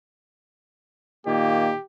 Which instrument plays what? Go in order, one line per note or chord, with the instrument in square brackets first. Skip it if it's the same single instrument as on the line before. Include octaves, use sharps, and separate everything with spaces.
[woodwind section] A#2 D#3 A#3 [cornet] G4